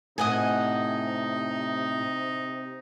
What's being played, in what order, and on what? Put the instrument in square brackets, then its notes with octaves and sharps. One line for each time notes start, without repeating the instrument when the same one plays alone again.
[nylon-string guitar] A2 [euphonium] C3 [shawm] D#4 [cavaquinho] D#5 F#5 G#5